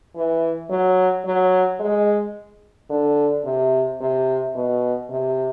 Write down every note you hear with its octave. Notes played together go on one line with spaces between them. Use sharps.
E3
F#3
F#3
G#3
D3
C3
C3
B2
C3